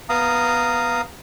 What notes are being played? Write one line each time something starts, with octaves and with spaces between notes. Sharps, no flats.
B3 F5 A#5 D#6